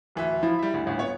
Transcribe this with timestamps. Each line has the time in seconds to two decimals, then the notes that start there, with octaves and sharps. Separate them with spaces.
0.15 D1 E3 E5
0.43 F3 E4
0.59 G3 E5
0.74 D2
0.86 G1 D2 A2
0.99 B3 C#5